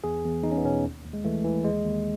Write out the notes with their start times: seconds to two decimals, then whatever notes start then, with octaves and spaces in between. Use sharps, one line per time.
0.04 E2 G#4
0.24 E2
0.43 E2 D#4
0.51 C#4
0.57 B3
0.64 B2 C#4
0.84 D#2
1.04 D#2
1.13 G#3
1.25 E3 A3
1.44 E3
1.65 D#2 G#3
1.85 D#2